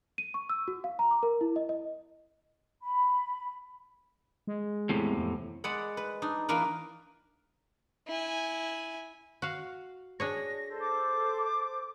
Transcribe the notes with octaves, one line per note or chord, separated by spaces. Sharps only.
D#7
C#6
E6
F#4
F5
A#5
D6
A#4
E4
D#5
D#5
B5
G#3
E2 A2 C3
F2
G#3 D5 F#5 B5
B4
D4 D#4
E3 A#3 D4 A#4 B4
E4 G#5
F#4 F5
D4 G#4 C#5 A#6
A4 C5
D6